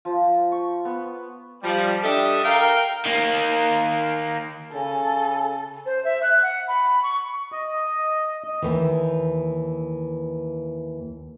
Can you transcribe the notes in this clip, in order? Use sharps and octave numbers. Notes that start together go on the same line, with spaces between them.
F3
C#6
B3
F3 G3
G3 D4 G4 A4 D#5 E5
A#4 F5 G5
D#3 A#3
C#3 A4 G#5
C5
E5
F#6
F#5
B5
C#6
D#5
D#2 E3